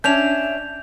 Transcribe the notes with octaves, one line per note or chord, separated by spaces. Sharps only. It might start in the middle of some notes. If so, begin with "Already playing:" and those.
C#4 D4 E5 G6 F7